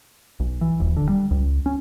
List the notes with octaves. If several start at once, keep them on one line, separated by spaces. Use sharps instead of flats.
B1
E3
D#1
D3
G3
C#2
C#4